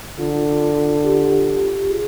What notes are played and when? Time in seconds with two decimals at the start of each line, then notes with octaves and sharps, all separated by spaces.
0.19 D3 F4
1.05 G4
1.90 G#4